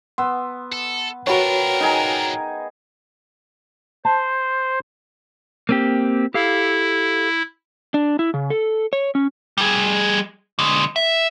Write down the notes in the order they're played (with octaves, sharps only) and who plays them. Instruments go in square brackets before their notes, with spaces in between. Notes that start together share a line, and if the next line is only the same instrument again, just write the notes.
[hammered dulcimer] B3 [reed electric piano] C6 E6
[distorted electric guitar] A4
[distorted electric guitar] D4 F4 [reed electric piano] F#4 C#5 [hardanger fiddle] A#4 [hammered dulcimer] B4 G5 B5
[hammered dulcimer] D#4 G#4 G#5
[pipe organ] C5 [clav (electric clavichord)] A5
[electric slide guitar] A#3 C4 G4
[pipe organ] E4 [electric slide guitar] G4 A4 F5
[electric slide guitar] D4
E4
C#3
A4
C#5
C#4
[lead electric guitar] G3 G#4
D3 G#3
E5